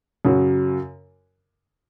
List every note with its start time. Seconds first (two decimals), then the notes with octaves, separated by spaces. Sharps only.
0.25 F#2 C#3 F#3 C#4 F#4